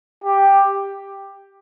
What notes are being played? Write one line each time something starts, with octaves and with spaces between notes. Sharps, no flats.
G4